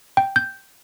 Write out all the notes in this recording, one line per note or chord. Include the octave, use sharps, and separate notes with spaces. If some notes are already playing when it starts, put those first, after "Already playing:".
G5
G6